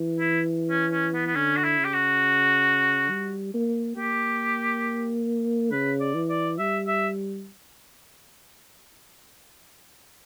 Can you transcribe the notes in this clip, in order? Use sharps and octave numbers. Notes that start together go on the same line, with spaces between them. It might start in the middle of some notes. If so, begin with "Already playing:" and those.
Already playing: E3
E4
C#4
C#4
B3
B3
D3 C#4
F#4
E4
C#3
G4
F#4
G3
A#3
A#3 G4
C#3 B4
D5
E3
D5
G3 E5
E5